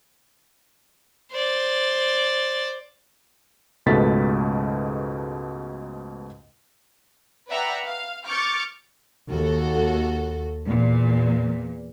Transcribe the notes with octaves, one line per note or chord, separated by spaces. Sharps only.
C5 D5
C#2 G#2 B2 A3 A6 B6
B4 D5 E5 F#5 G5 A#5
F5
C#6 D6 F6 G6 A6 C#7
D#2 F#4 A4
E2 A#2